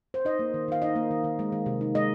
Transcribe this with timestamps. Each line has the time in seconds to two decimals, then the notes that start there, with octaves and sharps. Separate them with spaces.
0.14 C5
0.25 D#4 D#5
0.39 A#3
0.54 D#3
0.68 D#3 F5
0.82 D#4 D#5
0.95 A#3
1.11 D#3
1.24 D#3
1.39 G#3
1.52 D#3
1.66 C3
1.81 D#4
1.95 G#3 D#5